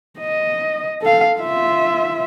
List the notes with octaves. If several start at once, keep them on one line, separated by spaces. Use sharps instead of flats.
D#5
A4 F5
F4 E5